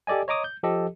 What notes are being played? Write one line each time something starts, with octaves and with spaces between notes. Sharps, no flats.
G4 A4 D5 D#5 G#5
C#5 D#5 A#5 D6 D#6
G6
F3 G4 A4 D#5